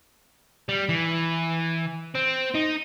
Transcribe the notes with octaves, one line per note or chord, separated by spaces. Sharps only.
G3
E3
C4
D#4